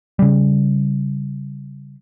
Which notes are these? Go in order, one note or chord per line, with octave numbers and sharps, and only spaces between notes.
C#3 G3